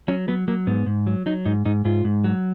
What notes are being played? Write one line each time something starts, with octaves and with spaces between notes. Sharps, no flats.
F#3 C#4
F#3 B3
F#3 A#3
G#2 B3
G#2
F#3
F#3 D#4
G#2 D#4
G#2 D#4
G#2 F4
G#2
F#3